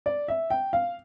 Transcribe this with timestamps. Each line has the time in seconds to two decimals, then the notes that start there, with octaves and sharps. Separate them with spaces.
0.06 D5
0.28 E5
0.50 G5
0.73 F5